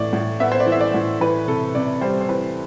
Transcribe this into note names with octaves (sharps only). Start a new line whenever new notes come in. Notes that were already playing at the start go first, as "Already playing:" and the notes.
Already playing: A2 E3 D5
A2
B3 E5
C5
D5
E3
E5
D5
A2
E3 B4
C3 A4
C3 D5
G3 C5
C5
E3 B4